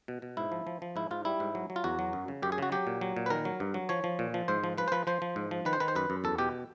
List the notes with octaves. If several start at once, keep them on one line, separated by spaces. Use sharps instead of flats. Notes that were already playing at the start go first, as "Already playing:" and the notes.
B2
B2
G#2 E4
F3
F3
F3
G#2 E4
G#2 F4
G3 E4
G#2
F#3
F#3
F4
E2 F#4
F#3
F#2
C#3
F#2 G4
G#4
C#3 F#4
F#3 G4
A#2
F#3
A#2
B4
D#3 A#4
F#3
G2
F#3
F3 C#5
F3
A#2
F3
G#2 C5
F3
F3 B4
C5
F3 B4
F3 C5
F3
G#2
F3
D#3 B4
C5
D#3 B4
C5
F#2 B4
F#2
E2 A4
B2 G4